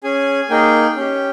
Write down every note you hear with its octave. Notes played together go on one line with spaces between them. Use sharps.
C#4 G#4 G#5
A#3 D#4 G#4 G5
C#4 G4